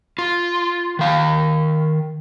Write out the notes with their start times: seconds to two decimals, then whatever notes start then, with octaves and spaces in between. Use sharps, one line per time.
0.19 F4
0.99 D#3 F5